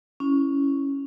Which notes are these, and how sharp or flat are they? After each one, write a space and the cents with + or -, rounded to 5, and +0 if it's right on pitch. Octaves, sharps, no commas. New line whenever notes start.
C#4 +0 E4 +0